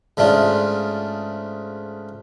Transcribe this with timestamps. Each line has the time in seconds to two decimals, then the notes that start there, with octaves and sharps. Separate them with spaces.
0.17 G#2 C#3 A3 D4 F4